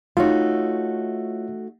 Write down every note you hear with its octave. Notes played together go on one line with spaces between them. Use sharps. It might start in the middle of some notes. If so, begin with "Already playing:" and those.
A3 D#4 F4 F#4 C#5